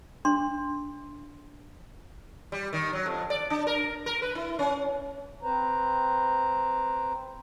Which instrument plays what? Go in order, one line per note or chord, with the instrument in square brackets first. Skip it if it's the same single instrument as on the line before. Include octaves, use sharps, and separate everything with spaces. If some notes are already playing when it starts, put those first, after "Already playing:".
[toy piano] D4 C6
[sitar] G3
D#3
F#3
F2
D5
D4
A#4
A#4
B4
E4
C#4
[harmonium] C4 B4 C5 A#5